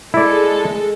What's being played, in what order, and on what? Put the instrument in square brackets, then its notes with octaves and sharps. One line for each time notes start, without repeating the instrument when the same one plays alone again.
[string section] G#3 A4 [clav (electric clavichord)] E4 D5